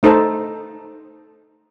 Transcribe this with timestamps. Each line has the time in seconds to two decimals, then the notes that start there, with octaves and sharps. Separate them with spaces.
0.03 A3 D#4 A4 C5 A5